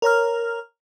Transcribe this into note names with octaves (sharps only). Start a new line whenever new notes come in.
A#4 C#5 A#5 F6